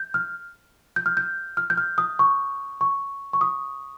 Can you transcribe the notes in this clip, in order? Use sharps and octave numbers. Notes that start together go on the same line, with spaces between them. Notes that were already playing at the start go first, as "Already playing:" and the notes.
Already playing: G6
F6
G6
F6
G6
F6
G6
F6
D#6
C#6
C#6
C#6
D#6